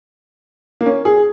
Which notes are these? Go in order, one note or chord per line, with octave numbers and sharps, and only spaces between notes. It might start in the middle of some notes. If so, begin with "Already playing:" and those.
A#3
C#4
G#4